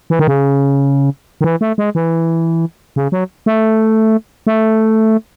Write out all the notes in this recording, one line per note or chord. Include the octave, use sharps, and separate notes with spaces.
E3
D#3
C#3
D#3
E3
A3
G#3
E3
C#3
F#3
A3
A3